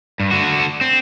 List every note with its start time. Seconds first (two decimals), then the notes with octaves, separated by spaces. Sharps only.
0.20 G2
0.31 D3 F#4
0.81 C4